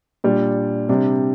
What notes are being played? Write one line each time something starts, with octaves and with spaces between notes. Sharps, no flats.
A#2 G3 D4
C3 G3 D4